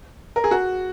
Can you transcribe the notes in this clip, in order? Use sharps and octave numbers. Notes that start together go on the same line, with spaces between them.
A#4
G#4
F#4